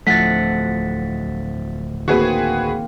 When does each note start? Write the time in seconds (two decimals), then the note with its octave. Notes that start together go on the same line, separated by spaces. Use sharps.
0.07 D1 F3 A3 F#5 A6 B6
2.08 D#3 A#3 C4 F#4 G#4 B4